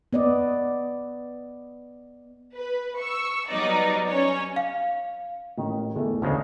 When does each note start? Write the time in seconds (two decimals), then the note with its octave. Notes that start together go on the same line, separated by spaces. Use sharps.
0.13 B3 D5 D#5
2.55 B4
2.98 C#6 E6
3.48 F#3 G3 B3 D#4 D5
4.07 C#4 C#5
4.56 F5
5.58 A1 D#3
5.95 E2 A3
6.22 D2 C#3 G#3 F6